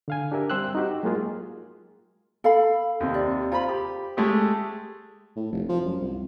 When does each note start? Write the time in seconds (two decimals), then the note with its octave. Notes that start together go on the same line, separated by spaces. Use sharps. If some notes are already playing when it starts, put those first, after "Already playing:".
0.08 D3 F5 G#5
0.32 D4 G4 A#4 E5
0.50 G3 C4 C5 G5 E6 F#6
0.75 D#4 F#4 G4
1.03 F#3 G#3 A#3 F4 G#4
2.44 A4 F5 B5
3.00 D#2 C3
3.14 D5
3.52 F4 C5 A#5 B5
3.69 G4
4.17 G#3 A3 G4
5.36 A2
5.52 F1
5.69 F3
5.86 F#2
6.00 C2